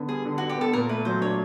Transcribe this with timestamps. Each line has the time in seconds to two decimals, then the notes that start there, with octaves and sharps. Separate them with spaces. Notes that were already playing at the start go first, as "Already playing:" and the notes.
Already playing: D3 B3
0.09 G3 G#4
0.25 D3
0.38 D3 F#4
0.49 G4
0.58 B3 A4
0.73 A#2 A#4
0.89 A3 B4
1.05 F#3 C5
1.21 D4 C#5